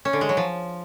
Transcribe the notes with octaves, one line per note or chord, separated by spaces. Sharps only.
C#4
D3
G#3
F#3
F3